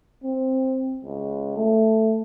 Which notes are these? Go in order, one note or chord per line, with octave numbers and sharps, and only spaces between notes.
C4
C#2
A3